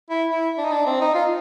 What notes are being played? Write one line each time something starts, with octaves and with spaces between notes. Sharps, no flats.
E4
E4
D4
D#4
D4
C4
D#4
F4